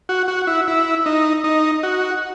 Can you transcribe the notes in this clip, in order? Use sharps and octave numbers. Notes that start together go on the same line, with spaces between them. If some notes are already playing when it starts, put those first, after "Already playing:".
F#4
F#4
E4
E4
D#4
D#4
F#4